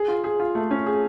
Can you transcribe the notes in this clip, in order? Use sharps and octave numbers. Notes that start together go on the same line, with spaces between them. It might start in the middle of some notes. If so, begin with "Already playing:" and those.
Already playing: G#4
F4
G#4
F4
A3
C#4
G#4